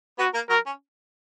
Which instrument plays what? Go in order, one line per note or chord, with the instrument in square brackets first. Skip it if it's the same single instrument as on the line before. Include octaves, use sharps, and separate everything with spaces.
[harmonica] B3 B4 [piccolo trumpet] F#4
[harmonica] A#3 A#4
[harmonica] F#3 F#4 [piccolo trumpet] A#4
[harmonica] C#4